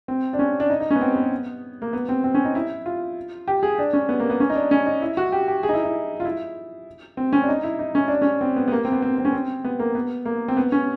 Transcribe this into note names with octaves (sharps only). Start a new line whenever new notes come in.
C4
D4
C#4
D4
D#4
D#4
C#4
B3
C4
B3
A#3
B3
C4
C4
C#4
D#4
E4
F4
G4
G#4
D4
C#4
B3
A#3
B3
C#4
D#4
D4
C#4
D#4
E4
F#4
G4
G4
G#4
D#4
E4
E4
F4
E4
C4
C#4
D4
D#4
E4
D#4
C#4
D4
C#4
C4
B3
B3
A#3
C4
B3
C4
C4
C#4
C4
B3
A#3
B3
A#3
C4
B3
C#4